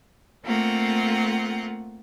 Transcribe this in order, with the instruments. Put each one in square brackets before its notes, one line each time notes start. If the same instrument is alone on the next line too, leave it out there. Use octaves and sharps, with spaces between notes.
[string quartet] A3 A#3 C4 F4 F#5